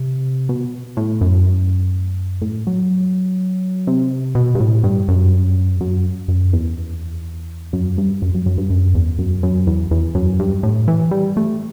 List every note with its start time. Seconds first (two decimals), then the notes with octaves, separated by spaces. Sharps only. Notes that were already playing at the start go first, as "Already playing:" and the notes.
Already playing: C3
0.49 B2
0.97 A2
1.21 F#2
2.42 A2
2.67 F#3
3.87 C3
4.35 B2
4.55 G2
4.60 A2
4.84 G2
5.08 F#2
5.81 F#2
6.28 F#2
6.53 E2
7.73 F#2
7.98 G2
8.22 F#2
8.35 F#2
8.46 F#2
8.58 G2
8.70 F#2
8.95 E2
9.19 F#2
9.43 F#2
9.67 E2
9.91 E2
10.15 F#2
10.39 G2
10.63 A2
10.88 E3
11.11 G3
11.37 A3